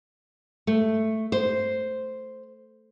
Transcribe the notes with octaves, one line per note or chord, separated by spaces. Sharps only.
A3
C5